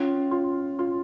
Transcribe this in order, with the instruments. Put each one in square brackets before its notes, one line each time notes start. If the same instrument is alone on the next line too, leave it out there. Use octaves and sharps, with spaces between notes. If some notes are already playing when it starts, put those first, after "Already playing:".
Already playing: [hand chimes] C#4 [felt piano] F4
[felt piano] F4
F4